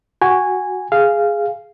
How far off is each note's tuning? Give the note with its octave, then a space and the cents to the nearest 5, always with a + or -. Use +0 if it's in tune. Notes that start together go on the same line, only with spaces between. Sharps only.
F#4 +0 G#5 -10
G#4 +0 F5 -10